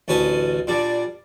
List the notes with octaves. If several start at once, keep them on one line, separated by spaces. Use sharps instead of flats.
A1 D2 C#4 B4 G#5 A5
A#2 G3 D4